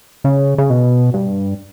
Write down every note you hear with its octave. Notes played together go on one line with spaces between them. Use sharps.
C#3
C#3
B2
G2